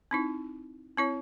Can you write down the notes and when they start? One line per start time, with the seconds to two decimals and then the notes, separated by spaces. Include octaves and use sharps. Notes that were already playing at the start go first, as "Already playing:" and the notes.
0.11 C4 D#4 E4
0.97 C4 E4 C#5